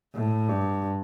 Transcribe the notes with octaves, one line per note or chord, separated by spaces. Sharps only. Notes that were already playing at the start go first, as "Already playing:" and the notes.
A2
G2